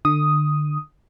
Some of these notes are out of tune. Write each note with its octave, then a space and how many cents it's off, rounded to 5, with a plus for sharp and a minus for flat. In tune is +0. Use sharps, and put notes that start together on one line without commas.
D3 +25 D#6 +0